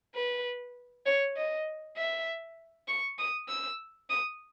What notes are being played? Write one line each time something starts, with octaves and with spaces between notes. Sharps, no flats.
B4
C#5
D#5
E5
C#6
D#6
E6
D#6